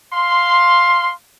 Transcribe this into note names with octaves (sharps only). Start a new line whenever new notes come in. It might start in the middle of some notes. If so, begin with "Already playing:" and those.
F5 C6